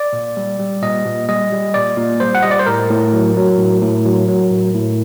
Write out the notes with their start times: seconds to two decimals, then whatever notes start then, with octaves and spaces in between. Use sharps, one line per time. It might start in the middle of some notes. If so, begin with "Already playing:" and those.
Already playing: D5
0.13 A#2
0.37 G3
0.59 G3
0.82 A#2 D#5
1.05 A#2
1.29 G3 D#5
1.52 G3
1.74 A#2 D5
1.97 A#2
2.20 G3 C5
2.35 F#5
2.43 G3 D#5
2.51 D5
2.59 C5
2.66 A2 A#4
2.90 A2
3.13 F#3
3.37 F#3
3.58 A2
3.82 A2
4.05 F#3
4.28 F#3
4.51 A2
4.75 A2